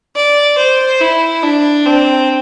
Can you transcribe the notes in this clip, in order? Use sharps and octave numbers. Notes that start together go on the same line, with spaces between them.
D5
C5
E4
D4
C4